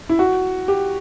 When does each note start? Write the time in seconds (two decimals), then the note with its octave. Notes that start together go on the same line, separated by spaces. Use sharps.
0.09 E4
0.19 F#4
0.68 G4